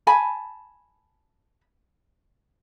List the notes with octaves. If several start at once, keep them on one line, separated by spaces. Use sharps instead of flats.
G#5 A5 B5